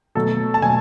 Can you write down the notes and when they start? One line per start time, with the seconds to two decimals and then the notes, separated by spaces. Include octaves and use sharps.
0.15 B2 F#3 A3 A4
0.54 A5
0.62 B2 F#3 A3 G#5